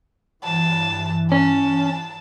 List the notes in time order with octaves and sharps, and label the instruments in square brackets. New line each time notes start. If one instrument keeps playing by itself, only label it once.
[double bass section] G2 E3 [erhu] A5
[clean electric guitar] C#4 [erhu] A5